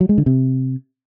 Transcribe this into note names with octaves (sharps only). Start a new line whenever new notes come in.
F#3
G#3
D3
C3